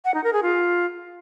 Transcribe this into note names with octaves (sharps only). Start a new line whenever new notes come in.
F#5
D#4
A#4
G#4
F4